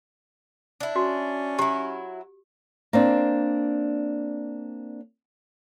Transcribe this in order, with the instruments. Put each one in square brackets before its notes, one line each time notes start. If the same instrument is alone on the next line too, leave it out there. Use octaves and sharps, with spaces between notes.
[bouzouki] D4 E4
[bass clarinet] C#4 [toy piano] F#4
[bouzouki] F#3 E4 [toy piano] G4
[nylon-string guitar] A#3 C4 D4